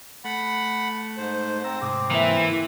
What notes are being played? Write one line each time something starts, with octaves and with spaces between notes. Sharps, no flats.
A3 F#5 B5
G#2 C5
C4 A#5 E6
G#2 C3 D6 D#6
E3 A#3 E5